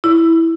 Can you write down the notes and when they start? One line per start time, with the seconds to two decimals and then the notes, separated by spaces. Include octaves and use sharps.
0.04 E4